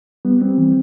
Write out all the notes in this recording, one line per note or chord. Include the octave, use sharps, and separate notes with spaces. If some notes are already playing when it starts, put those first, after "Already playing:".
G3 B3
G3 C4
E3